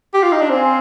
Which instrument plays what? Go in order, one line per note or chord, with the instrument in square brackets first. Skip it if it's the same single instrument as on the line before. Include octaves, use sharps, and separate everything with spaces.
[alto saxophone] G4
F4
D#4
D4
[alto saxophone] C4 [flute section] C5 F5 G#5 C6